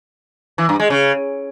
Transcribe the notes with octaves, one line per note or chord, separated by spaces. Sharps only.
E3
G2
G#3
C#3